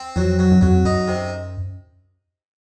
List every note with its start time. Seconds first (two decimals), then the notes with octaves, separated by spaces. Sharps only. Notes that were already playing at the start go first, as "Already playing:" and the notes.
Already playing: C4
0.16 F2 F#3
0.39 F#3
0.52 F#2
0.61 F2 F#3
0.85 F#2 D#4
1.08 C3